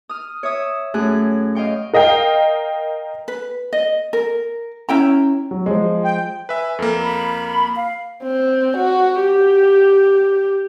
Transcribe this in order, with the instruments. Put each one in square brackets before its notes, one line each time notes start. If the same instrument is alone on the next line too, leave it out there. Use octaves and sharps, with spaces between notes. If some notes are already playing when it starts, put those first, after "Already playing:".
[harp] D#6 F6
C#5 E5 D#6
F#2 A3 G#4 F#6
D#5 F5 G5 C#6
[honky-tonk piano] A#4 D#5 F5 G5
[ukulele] B4
D#5
A#4
C#4 E4 G5 A#5
[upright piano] F#3
F3 G#3
[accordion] G5
[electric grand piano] B4 E5 [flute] G#5
[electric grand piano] F2 A#3 [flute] A4
[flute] B5
F5
[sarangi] C4
F#4
G4